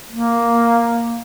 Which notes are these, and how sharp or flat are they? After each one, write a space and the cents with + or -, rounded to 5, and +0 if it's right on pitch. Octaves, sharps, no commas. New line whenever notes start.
A#3 +0